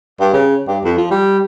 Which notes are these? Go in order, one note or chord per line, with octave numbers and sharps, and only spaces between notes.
G2
C#3
G2
F2
F3
G3